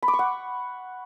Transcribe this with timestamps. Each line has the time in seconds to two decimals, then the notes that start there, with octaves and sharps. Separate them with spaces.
0.02 B5
0.08 D6
0.14 C#6
0.19 F#5